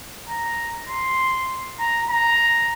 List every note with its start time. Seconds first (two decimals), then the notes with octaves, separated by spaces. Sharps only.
0.29 A#5
0.89 C6
1.80 A#5
2.10 A#5